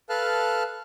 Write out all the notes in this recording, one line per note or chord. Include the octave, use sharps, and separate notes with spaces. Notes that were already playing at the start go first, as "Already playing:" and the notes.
A4 B4 F5 A5 F6 F#6